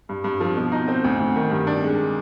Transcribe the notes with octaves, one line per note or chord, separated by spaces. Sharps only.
G2
G2
F3
B2
D#4
C4
D2
D2
D#3
G2
D4
G#3